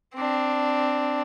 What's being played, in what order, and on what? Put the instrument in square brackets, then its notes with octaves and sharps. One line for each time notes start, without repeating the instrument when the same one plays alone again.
[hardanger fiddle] C4 D4